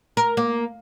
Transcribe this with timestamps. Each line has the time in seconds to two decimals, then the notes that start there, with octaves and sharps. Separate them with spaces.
0.17 A#4
0.37 A#3